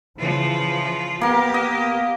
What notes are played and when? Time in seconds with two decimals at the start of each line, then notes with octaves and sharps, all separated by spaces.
0.18 C#3 E3 F3 F4
1.21 A#3 B3 G4 A#4
1.54 D#5